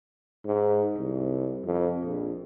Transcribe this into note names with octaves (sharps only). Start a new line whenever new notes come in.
G#2
C2
F2
A#1